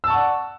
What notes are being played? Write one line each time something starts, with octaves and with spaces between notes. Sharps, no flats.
D5 F#5 A5 C#6 E6